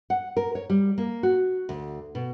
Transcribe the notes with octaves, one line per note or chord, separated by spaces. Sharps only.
F#5
A#4
C#5
G3
A#3
F#4
D2
B2